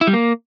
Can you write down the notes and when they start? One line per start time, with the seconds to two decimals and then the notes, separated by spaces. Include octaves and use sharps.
0.01 E4
0.07 G3
0.13 A#3